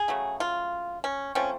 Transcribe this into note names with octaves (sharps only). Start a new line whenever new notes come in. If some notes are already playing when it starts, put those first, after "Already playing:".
Already playing: G#4
C#3 F#3 A3
F4
C#4
F3 A3 C4 C#4